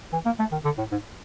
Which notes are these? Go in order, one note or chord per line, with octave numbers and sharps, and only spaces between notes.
E3
A#3
A3
D#3
D3
A2
G#2